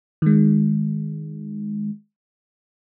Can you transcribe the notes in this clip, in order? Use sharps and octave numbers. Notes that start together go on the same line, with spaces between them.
D#3 G#3